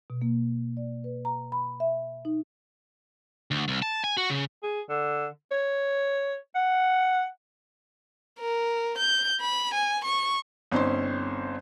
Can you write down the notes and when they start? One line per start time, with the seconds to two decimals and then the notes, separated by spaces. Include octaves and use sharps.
0.10 B2
0.22 A#3
0.77 D5
1.04 B4
1.25 A#5
1.52 B5
1.80 E5
2.25 D#4
3.51 D2
3.68 C2
3.82 A5
4.04 G#5
4.17 F#4
4.30 C#3
4.63 G#4
4.89 D3
5.52 C#5
6.55 F#5
8.40 A#4
8.98 G6
9.41 B5
9.74 G#5
10.05 C#6
10.72 G1 C4 C#4 D#4 C5 C6